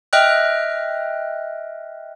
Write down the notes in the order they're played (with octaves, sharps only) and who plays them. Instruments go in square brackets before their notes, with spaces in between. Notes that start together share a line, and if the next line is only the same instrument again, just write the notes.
[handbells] D#5 E5 G5 F6 F#6